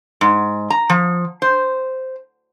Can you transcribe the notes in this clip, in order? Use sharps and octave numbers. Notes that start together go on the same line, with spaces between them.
G#2
A#5
F3
C5